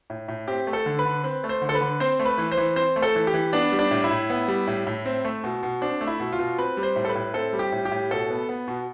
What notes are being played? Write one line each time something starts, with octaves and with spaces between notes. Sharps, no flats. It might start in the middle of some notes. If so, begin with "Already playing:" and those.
A2
A2
C4 G4
A3
A4
D3
B4
D3
C4 B4
A3
C5
D3
A4
B4
D3
C4 C5
A3
B4
E3
C5
E3
C4 C5
A3
A4
E3
G4
E3
B3 D4
G3
D4
A2
E4
A2
B3
G3
A2
A2
C4
A3
B2
B2
C4 D4
A3
E4
B2
F4
B2
C4 B4
G3
C5
A2
A4
B4
A2
C4 A4
G3
G4
A2
G4
A2
B2 A4
B3
B3
B2